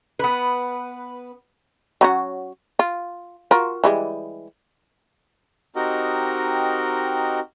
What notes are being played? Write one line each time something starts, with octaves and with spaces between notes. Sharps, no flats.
B3 B4
F#3 C#4 F#4
F4
F4 F#4 A#4
E3 G3 G#3
C4 D#4 F#4 G4 A#4 D#5